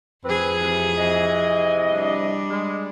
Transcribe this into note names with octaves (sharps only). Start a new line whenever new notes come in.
F2 C4 G#4 B4
C3 E3
C3 E3 D#5
G3 D4
G#3